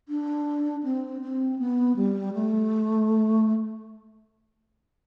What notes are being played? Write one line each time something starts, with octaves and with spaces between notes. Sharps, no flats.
D4
C4
C4
B3
G3
A3